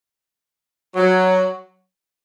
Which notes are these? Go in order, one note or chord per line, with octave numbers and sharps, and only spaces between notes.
F#3